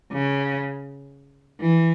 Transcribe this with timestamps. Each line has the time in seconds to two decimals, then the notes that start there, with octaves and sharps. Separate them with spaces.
0.12 C#3
1.61 E3